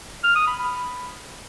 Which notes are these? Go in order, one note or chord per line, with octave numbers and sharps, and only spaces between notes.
F6
D#6
B5
B5